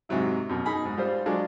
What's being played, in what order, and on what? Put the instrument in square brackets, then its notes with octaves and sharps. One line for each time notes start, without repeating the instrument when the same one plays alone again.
[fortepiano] G#2 C3 F#3 E4
F#2 B2
D#4 G#4 B5
G#2
G3 F4 C5
F#3 G#3 D4 F4